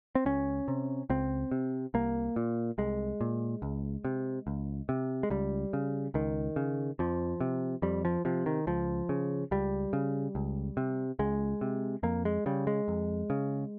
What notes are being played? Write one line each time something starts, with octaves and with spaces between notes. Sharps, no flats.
C4
C#2 C#4
C3
C#2 C4
C3
C2 A#3
A#2
C2 G#3
A#2
C#2
C3
C#2
C3
G#3
C#2 G3
C#3
C#2 D#3
C#3
F2 F3
C3
F2 G3
F3
C3 F3
D#3
C#2 F3
C#3
C#2 G3
C#3
C#2
C3
C#2 G#3
C3
F2 A#3
G#3
C#3 G3
G#3
F2
C#3